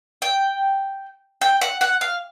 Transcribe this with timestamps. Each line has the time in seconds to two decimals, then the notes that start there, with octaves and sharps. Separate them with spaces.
0.22 G5
1.41 G5
1.61 F#5
1.81 F#5
2.01 F5